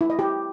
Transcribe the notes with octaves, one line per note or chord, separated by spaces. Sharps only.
E4
D#5
G4